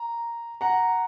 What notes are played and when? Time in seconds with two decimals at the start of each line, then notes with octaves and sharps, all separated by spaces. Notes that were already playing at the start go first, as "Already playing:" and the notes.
Already playing: A#5
0.61 F#5 A#5